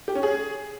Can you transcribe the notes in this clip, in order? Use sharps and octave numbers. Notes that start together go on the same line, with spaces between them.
G4
C#4
G#4